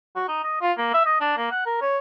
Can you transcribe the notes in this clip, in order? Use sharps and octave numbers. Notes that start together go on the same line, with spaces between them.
F#4
D#4
D#5
F4
A#3
E5
D#5
D4
A#3
F#5
A#4
C#5